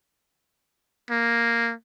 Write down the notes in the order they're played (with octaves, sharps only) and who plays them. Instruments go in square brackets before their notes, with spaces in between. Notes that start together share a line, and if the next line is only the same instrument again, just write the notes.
[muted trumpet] A#3